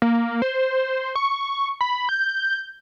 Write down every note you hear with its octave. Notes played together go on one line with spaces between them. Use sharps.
A#3
C5
C#6
B5
G6